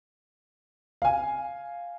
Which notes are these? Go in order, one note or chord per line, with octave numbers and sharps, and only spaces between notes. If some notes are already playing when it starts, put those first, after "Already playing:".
F5 G#5